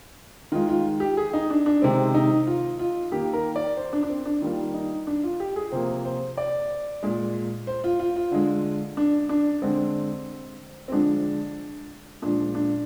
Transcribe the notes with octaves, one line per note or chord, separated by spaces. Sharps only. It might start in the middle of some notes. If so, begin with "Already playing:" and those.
D#3 G#3 F4
F4
G4
G#4
D#4
D4
D4
C3 D#3 G#3 C4
D#4
F4
F4
D#3 A#3 G4
A#4
D5
C5
D4
D4
C4
D4
D#3 G3 A#3 F4
D#4
D4
F4
G4
G#4
C3 F3 A#3 C5
C5
D5
A#2 G#3
C5
F4
F4
F4
D3 G#3
D4
D4
D3 G#3 C4
C4
D3 F3 G#3 D4
A#2 F3 G#3 D4
D4